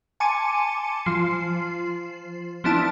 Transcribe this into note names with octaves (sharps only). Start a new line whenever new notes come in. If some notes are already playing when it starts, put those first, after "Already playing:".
G#5 A5 C6 D6 C#7 D#7
F3 C7
F3 B3 D4 E4 A5